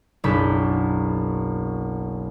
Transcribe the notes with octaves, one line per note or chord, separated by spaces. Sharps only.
F#1 B1 D4 B5 G6